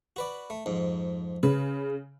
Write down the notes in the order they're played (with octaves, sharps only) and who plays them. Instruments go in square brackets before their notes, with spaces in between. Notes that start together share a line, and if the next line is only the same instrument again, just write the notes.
[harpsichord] F#4 B4 D5
A3
F2 G#2
[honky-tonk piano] C#3 [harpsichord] B4